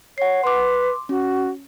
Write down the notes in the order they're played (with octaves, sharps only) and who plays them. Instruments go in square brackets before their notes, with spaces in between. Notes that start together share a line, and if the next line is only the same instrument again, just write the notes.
[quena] C#5 [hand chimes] F#5 C7
[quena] B4 [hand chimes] C6 D6
[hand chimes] C#4 [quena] F#4